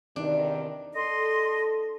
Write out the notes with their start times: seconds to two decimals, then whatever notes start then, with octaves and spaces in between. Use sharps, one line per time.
0.16 E2 C3 D#3 D4
0.95 A4 D#5 C6